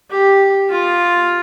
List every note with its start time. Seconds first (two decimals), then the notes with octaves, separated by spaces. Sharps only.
0.11 G4
0.70 F4